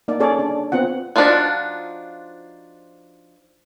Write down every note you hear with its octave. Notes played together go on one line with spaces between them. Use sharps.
A#3 D#4 D5
C#4 G#4 A4 C#5 D5
D4
B3 C4 F4 F#5
F3 D4 D#4 F4 F#4